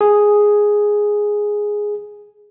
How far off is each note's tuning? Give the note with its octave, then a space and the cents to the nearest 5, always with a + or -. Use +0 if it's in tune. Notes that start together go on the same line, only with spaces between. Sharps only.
G#4 +0